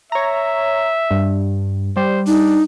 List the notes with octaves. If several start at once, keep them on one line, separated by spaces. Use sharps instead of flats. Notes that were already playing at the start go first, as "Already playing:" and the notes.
C#5 E5 A#5
G2
G3 C5
D4 D#4